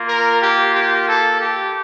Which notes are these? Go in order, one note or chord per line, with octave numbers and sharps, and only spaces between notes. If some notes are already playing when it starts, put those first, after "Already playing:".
Already playing: A#3 F4
A#4
G4
G4
A4
G4